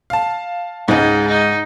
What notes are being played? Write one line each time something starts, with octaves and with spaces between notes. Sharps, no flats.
F5 A5
C#2 G#2 G#3 D#4
D#4